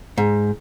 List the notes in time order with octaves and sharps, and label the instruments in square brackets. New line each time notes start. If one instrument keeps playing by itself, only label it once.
[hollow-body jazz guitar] G#2